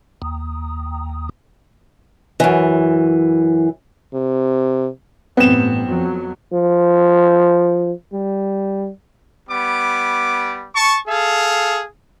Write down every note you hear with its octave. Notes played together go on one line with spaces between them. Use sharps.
D#2
F#2 E3
C3
A1 G2 B3 C4 E7
F2 F#3
F3
G3
G3 B3 D6
A5 C#6
G#4 A4 F5